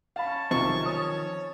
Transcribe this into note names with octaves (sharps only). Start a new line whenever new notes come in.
C#4 F5 A5 B5
B1 C3 D#3 F3 C4 C#6
C#5 D#6